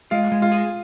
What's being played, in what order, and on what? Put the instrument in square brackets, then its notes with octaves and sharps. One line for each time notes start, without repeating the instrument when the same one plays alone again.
[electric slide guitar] G#3 [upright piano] F4
[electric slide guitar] G#3
[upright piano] F4
[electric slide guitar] G#4